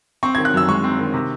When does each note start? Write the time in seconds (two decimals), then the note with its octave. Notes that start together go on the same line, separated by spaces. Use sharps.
0.23 C4 C#6
0.35 D#3 G#6
0.45 F#6
0.54 F#2 E6
0.68 G#3 C#6
0.84 C4
0.99 D#3
1.14 C3